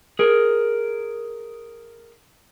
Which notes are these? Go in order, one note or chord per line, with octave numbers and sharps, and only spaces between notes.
G#4 A#4